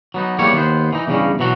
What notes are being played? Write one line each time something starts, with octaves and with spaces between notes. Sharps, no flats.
F#3 B3 D#4
E2 A2 G3 A#3 C#5
D#2 B3 C5
E3 D#4
E2 G2 C#3 G3 C#4 D#4
B2 E3 F#3 F#4